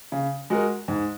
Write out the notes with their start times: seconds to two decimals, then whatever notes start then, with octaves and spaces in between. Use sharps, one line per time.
0.12 C#3
0.50 G#3 F#4 A#4
0.88 G#2